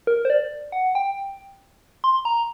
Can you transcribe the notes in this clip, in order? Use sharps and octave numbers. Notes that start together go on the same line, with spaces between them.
A#4
C5
D5
F#5
G5
C6
A#5